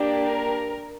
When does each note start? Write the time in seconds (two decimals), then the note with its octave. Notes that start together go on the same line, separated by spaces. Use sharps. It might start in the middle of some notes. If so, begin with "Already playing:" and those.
Already playing: A#3 D4 G4
0.28 A#4